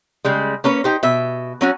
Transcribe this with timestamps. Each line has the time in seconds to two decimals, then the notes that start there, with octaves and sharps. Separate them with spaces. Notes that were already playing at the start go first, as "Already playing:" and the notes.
0.25 C#3 G3 G#3
0.64 A#3 C#4 B4 C#5
0.84 D#4 G4 C5
1.03 B2 E5
1.61 F#3 C#4 F#4